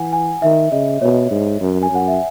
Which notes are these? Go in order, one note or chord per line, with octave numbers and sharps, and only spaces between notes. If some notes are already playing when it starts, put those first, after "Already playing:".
Already playing: E3 F#5 G#5
G#5
D#3 E5
C#3 D#5
B2 C#5
G#2
F#2
G#5
F#2 F#5
E5